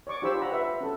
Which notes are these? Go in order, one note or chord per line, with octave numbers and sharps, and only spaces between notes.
C#5 D5 C#6 D6
D4 F4 G4 C5 B5 E6
F#5 A#5 B5
B4 E5 F#5
C#4 A4